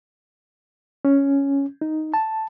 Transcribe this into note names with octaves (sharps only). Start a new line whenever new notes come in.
C#4
D#4
A5